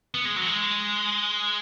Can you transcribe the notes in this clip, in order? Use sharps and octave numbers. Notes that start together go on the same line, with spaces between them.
B3
G#3
F#3
G#3